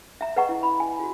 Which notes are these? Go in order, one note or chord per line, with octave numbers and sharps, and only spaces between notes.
E5 A#5
B4 D#5 F#5 A#5 C#6
E4
B5
G#5
F4 F#4